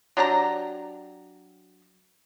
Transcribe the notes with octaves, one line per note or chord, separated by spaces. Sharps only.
F#3 D4 G4 A#5